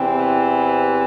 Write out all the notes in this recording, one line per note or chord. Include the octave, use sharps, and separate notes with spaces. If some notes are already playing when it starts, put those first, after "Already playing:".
Already playing: E2 C3 E3 C4